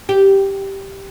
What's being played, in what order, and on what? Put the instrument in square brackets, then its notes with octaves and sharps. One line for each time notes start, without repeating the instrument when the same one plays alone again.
[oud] G4